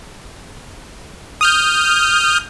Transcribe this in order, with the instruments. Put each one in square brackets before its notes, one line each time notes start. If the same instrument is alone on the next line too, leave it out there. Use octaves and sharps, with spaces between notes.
[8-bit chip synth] D#6 F6 G6